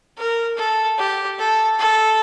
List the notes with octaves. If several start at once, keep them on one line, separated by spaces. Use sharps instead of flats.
A#4
A4
G4
A4
A4